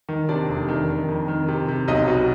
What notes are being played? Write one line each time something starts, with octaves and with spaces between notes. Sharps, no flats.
D#3
C3 D4 D5
F1
D#3
D#3
F2
D#3
C3
C3
B1 D#4 D#5
B2